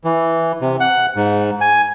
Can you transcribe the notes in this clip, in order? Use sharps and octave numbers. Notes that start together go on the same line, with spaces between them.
E3
C3
F#5
G#2
G#5